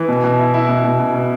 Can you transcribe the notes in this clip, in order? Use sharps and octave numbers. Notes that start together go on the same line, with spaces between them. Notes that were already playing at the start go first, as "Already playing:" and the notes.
Already playing: E3
B2
B2
E4
E4
B2
B2
B2
B2